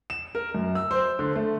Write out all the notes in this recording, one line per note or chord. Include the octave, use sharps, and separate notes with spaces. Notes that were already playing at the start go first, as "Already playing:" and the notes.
E7
A#4
F#2
E6
C5
D3
A3